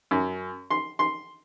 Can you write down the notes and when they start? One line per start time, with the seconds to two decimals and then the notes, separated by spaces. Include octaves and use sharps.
0.11 F#2
0.70 C6
0.99 C6